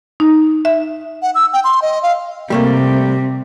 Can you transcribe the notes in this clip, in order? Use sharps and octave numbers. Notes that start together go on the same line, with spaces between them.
D#4
E5
F#5
E6
G5
C6
D#5
F5
C3 G3 A3 A#3